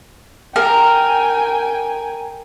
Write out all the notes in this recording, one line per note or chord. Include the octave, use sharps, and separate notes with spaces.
A#4 G5 G#5